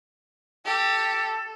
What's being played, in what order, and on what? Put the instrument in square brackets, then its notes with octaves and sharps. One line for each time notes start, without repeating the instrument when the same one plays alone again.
[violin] G4 [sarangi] A4